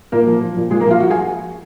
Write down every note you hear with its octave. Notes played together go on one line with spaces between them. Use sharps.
A#2 A#3 A#4
F3
F3
A#2
A#2 G#3 G#4
A#3 A#4
F3 F4 F5
F3 F#4 F#5
G#4 G#5